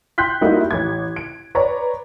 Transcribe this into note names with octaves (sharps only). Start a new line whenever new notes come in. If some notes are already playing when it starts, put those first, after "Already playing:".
G5 C6 F#6 G6 B6
G3 A3 A#3 D#4 E4 F#4
A1 G#6
D7
B4 C#5 D5 A#5